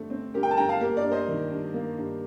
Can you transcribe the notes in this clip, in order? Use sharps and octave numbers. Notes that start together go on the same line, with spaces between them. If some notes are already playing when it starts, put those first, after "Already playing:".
Already playing: G2 D3 A3 C4
C4
D3 G4 A#4
G5
A5
G2 G5 A#5
F5 A5
A#3 G4 A#4
A#4 D5
G2
C5 D#5
D#3
G2
A#3
G2